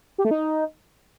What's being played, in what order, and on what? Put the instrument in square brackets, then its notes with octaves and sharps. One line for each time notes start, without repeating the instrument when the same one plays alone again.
[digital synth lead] G4
A3
D#4